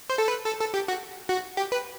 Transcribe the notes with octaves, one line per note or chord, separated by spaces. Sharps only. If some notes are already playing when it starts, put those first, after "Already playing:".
C5
A4
B4
A4
A4
G4
F#4
F#4
G4
B4